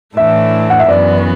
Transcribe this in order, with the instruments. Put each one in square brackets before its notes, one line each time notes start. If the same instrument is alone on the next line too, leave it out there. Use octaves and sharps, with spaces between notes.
[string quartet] A2 E3 A3 D4 [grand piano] E5
[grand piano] F#5
E5
[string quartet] F#2 E3 B3 [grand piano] D5